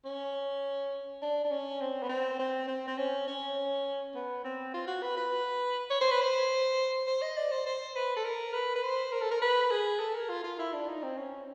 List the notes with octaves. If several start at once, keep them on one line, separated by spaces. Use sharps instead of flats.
C#4
D4
D4
C#4
C4
B3
C4
C4
C4
C4
C#4
C#4
B3
C4
F4
F#4
B4
B4
C#5
C5
B4
C5
C5
D#5
D5
C5
C5
B4
A4
A#4
B4
B4
C5
A#4
A4
A#4
B4
G#4
A4
A#4
F4
F4
E4
D4
D#4
C4
C#4